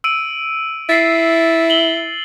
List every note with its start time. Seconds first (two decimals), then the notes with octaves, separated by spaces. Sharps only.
0.04 E6 D7 D#7
0.89 E4 A6 C7
1.70 F#7 G7